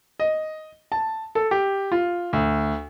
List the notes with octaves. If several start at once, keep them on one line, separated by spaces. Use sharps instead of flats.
D#5
A5
A4
G4
F4
D2